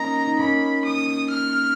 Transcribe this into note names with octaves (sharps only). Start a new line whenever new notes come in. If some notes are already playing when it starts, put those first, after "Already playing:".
Already playing: A#3 C#4 D#4 A#5
D#4
A#3 C#4 B5
D#6
F6